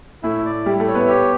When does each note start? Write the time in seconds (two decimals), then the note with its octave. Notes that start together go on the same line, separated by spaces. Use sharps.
0.23 A2 A3 E4
0.45 D5
0.66 G3 E4 G4
0.80 A3 A4
0.87 C#5
0.94 B3 B4
1.08 G4